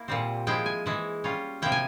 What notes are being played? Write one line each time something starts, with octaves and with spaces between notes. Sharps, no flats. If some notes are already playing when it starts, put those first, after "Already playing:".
Already playing: A#3 E4
A#2 G3 C4
F3 G#3 E4 G5
G#5
E3 G#3 E4
G3 C#4 F4
C3 F3 A#3 E4 G5
G#5